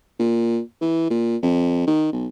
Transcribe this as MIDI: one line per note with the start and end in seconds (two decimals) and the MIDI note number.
0.19 0.59 46
0.81 1.05 52
1.10 1.36 46
1.42 1.85 41
1.87 2.10 51
2.12 2.26 35